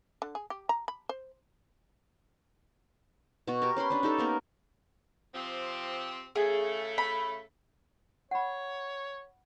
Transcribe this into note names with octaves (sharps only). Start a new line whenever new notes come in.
D3
G#4
G4
A#5
B5
C5
B2 F#4
G4 A#4
C#4 B4 B5 C6
C#4 D4
D#4 G4 A4
A#3 B3 A#4
C3 F3 C4
C#3 A3 G#4
B5
C#5 F#5 B5